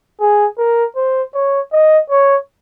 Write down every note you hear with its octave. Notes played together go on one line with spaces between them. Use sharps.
G#4
A#4
C5
C#5
D#5
C#5